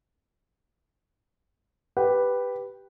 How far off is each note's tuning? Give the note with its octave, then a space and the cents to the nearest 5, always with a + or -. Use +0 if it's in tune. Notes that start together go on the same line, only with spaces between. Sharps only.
G4 +0 B4 +0